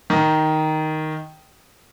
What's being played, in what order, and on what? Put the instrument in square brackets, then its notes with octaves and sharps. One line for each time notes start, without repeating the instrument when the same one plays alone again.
[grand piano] D#3